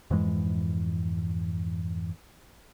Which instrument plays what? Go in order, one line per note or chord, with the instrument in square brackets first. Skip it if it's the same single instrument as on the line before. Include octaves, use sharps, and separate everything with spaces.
[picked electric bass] F2 G#2 E3 G#3